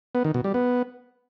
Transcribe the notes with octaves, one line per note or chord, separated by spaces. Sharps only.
B3
D#3
B2
G3
B3